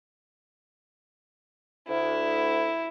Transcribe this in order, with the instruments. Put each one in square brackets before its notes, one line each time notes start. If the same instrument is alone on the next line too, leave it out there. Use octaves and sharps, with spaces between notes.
[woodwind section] D2 [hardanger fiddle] E4